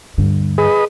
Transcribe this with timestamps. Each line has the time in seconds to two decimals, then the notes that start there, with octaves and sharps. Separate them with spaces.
0.18 D2 G2 D3
0.58 G#4 B4 D#5